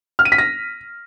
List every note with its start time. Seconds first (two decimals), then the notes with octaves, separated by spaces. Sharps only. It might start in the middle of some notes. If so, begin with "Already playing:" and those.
0.19 F6
0.25 D#7
0.32 B6
0.38 A#6